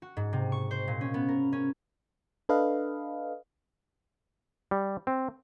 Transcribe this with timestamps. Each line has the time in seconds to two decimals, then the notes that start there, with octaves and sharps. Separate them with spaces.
0.02 F#4
0.17 G#2
0.33 C3
0.52 C#6
0.71 C5
0.88 A#2
1.01 C#4
1.14 B3
1.28 A#4
1.53 C#4
2.49 D4 A4 B4 D#5 F5
4.71 G3
5.07 C4